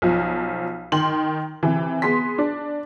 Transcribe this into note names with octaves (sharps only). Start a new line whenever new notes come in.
B1 F3
D#3 G5 C6 F#7
C3 E3
B3 G#4 C6 B6
D4